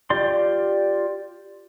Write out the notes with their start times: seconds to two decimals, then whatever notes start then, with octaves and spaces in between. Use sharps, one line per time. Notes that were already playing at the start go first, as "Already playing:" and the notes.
0.10 F4 G4 D5 C6